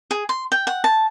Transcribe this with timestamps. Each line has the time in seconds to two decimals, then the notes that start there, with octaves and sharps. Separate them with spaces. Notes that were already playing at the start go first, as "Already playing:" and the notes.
0.11 G#4
0.29 C6
0.52 G5
0.67 F#5
0.84 A5